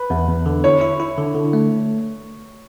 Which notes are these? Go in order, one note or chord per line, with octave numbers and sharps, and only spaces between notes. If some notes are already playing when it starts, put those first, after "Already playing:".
Already playing: B4
E2
E2
D3
E4 C#5
E4
E4
D3
D3
A3